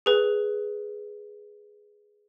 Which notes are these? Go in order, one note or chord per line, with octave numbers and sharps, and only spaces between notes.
G#4 B4